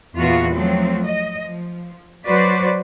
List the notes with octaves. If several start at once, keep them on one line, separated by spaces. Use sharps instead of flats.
E2 A#2 B3 F4 F#4
F3 F#3 A3 C4
D#5
F3
F#3 F#4 B4 C5 D5